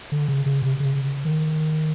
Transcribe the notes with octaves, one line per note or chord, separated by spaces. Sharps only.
D3
C#3
C#3
C3
C#3
D#3